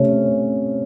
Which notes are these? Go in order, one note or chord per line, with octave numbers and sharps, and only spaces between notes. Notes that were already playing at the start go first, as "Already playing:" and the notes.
Already playing: C3 A3 C#4